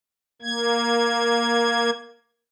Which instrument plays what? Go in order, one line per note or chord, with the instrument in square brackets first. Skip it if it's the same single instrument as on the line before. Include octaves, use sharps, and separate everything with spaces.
[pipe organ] A#3 G#6